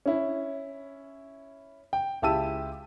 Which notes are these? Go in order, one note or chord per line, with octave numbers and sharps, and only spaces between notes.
C#4 E4
G5
C#2 E4 G4 A5 E6 D#7